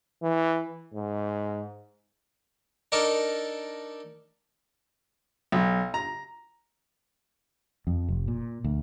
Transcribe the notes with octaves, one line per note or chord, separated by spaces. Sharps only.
E3
G#2
D4 D#4 A4 A#4 D5 A5
B1
A#5
F2
F1
A#2
D2